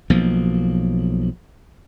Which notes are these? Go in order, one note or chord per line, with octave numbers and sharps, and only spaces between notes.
B1 F3 A#3